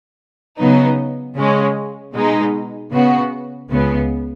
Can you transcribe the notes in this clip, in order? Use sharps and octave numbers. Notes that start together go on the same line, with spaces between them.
C#3 F#3 B3 D#4
C#3 G#3 C#4
B2 G#3 D#4
C#3 B3 F#4
C#2 C#3 B3